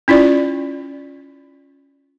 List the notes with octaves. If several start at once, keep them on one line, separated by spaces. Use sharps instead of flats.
C#4 E4 F4 D5